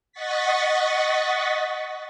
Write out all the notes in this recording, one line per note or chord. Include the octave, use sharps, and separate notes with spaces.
D#5 F#5 C#6 A6 B6